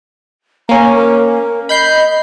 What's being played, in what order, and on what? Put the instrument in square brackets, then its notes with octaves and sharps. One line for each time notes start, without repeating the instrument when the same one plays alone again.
[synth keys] A#3 C#4 [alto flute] A#5
[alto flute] A#4
[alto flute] D#5 [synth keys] B5 G6 C7